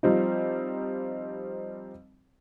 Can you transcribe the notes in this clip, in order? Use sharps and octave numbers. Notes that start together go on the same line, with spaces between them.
F3 G3 C4 D#4